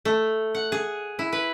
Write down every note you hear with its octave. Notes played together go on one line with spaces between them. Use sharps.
A3
F#5
G#4
E4
B4